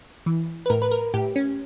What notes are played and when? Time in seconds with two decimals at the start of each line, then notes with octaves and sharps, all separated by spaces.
0.26 E3
0.66 B4
0.70 A2 A#4
0.82 B4
0.91 A#4
1.14 A2 G4
1.36 C#4